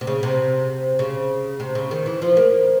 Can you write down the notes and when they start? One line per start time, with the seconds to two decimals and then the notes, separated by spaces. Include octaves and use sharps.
0.01 C3
0.07 C#3
0.23 C3
0.99 C#3
1.60 C3
1.75 C#3
1.91 D#3
2.06 E3
2.22 F3
2.37 A#3